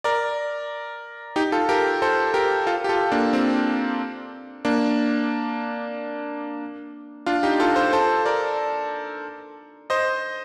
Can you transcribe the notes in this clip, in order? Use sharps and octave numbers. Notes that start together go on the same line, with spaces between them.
A#4 D5
D#4 G4
F4 A4
G4 A#4
A4 C5
G4 A#4
F4 A4
G4
F4 A4
A#3 D4
C4
A#3 D4
D4 F4
D#4 G4
F4 A4
A4 C5
A4 C5
A#4 D5
C5 D#5